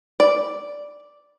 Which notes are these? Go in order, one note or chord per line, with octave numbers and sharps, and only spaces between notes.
D5